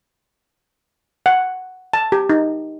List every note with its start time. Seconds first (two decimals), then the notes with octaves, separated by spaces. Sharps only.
1.26 F#5
1.93 A5
2.12 G4
2.30 D#4